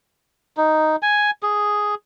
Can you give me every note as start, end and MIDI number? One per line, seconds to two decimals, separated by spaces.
0.57 0.96 63
1.03 1.31 80
1.43 1.95 68